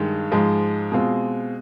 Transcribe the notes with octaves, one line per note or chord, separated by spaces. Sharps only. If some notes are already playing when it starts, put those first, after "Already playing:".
Already playing: G2 D#3 G#3
G#2 F3 G#3
B2 G#3 C4 F4